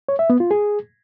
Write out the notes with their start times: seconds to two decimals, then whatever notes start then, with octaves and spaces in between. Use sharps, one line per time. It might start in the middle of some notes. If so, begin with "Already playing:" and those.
0.09 C#5
0.19 E5
0.30 B3
0.40 F4
0.51 G#4